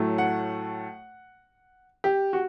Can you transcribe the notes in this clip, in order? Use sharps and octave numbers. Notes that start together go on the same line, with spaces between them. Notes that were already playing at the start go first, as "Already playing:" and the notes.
Already playing: A2 F#3 A3
F#5
G4
F#4